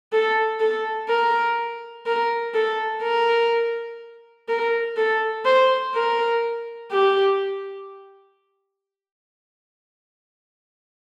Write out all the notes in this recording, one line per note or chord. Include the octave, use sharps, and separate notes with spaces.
A4
A4
A#4
A#4
A4
A#4
A#4
A4
C5
A#4
G4